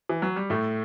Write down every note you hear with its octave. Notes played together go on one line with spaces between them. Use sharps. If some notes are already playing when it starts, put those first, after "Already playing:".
E3
F#3
G3
A2 A3